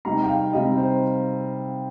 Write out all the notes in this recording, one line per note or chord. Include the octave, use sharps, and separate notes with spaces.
C3 G3 C4 D#4 A#5
G5
F5
C3 G3 C4 D#4 D#5
C5